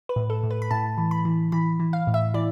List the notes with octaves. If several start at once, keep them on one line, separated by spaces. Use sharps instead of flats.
B4
A2
A4
A2
B4
B5
A2 A5
E3
B5
E3
E3 B5
E3
F5
A2
E5
E3 D5